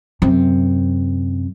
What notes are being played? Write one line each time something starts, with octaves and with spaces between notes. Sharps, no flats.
F#2 C3